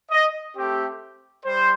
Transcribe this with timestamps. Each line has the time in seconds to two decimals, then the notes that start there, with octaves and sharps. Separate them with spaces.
0.10 D#5
0.55 A3 C4 G4
1.44 G3 C5